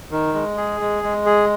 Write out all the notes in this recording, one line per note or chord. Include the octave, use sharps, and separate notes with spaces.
D#3
G#3
G#4
G#3
G#3
G#4